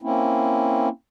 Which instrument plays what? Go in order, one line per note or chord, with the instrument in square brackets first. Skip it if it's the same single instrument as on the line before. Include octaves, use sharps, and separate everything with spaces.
[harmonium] A#3 C4 C#4 E4